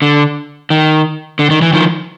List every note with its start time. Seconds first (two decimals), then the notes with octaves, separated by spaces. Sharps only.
0.02 D3
0.70 D#3
1.39 D3
1.51 D#3
1.62 E3
1.73 D#3 F3